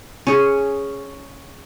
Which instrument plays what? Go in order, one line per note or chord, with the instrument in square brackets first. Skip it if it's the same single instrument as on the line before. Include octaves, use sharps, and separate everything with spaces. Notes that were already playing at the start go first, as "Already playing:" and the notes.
[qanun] C#4 G#4